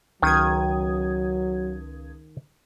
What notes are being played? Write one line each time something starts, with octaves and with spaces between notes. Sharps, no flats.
C#2 D#3 F#3 D#6 G#6